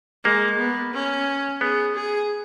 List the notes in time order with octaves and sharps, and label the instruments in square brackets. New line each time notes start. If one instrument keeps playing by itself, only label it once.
[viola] G#3 [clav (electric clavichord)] A#3
[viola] B3
C#4
[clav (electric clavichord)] B3 [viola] G#4
[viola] G#4